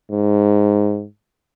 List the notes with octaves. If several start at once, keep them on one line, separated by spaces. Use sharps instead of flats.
G#2